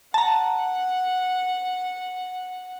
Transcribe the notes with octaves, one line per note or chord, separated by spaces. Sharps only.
F#5 A5 A#5